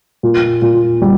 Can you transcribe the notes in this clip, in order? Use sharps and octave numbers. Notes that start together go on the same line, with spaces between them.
A#2
A#2
G3